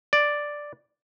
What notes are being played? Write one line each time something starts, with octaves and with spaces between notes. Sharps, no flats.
D5